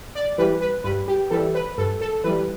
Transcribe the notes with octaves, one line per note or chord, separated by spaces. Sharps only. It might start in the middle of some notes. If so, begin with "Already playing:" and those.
D5
E3 G3 B4
B4
G2 B4
G4
E3 G3 A4
B4
G2 A4
A4
E3 G3 B4